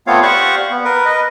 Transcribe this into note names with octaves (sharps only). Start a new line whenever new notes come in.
A3 B3 C4 F4 C#5 F5
G4 C5 D5 F5 F#5 C#6
B3
A#4 B4
B4 D#5